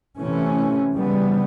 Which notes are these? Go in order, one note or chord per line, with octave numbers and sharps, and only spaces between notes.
C3 E3 A3 C#4
C#3 E3 G3 B3